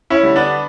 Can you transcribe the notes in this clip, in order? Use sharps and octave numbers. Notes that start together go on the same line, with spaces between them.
C#4 E4
D3 G3
B3 D4